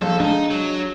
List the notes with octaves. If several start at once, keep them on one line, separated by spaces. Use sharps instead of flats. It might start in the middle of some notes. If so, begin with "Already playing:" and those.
A#1 A4
G#3 D4 D#4
F#3